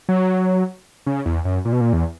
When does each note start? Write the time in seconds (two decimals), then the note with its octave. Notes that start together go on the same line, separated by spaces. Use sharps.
0.09 F#3
1.06 C#3
1.26 E2
1.45 F#2
1.65 A#2
1.72 B2
1.81 A#2
1.93 E2